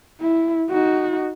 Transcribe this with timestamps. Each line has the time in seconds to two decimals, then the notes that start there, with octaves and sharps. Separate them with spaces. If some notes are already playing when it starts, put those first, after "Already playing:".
0.20 E4
0.70 D#4 F#4